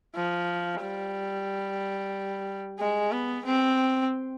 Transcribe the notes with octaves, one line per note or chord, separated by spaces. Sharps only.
F3
G3
G#3
B3
C4